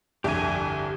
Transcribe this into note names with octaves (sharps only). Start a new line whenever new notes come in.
G1 C2 F2 G4 G#5